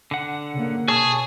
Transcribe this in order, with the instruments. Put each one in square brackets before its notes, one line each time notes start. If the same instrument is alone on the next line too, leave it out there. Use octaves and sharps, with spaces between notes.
[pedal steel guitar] D3 F#5
[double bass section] C#3 A#3
[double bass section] B2 [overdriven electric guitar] G#4 [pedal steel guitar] C#5 A5